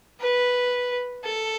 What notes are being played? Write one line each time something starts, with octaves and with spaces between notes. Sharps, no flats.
B4
A4